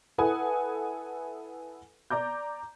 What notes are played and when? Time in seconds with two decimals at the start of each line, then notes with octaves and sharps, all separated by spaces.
0.18 E4 A4 B4 F#5 G#5 D#6
2.10 D5 A#5 D6 G6